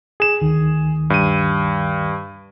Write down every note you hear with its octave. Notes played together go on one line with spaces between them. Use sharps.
G#4 E7
D2 D#3
G2 D#7